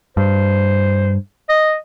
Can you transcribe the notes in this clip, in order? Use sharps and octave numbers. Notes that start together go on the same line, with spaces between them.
G2 C5
D#5